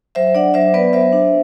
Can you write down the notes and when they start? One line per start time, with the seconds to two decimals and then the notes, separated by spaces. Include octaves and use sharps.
0.15 F#3 C5 E5
0.35 D4 D5 F#5
0.54 F#3 C5 E5
0.74 B3 B4 D5
0.93 F#3 C5 E5
1.12 D4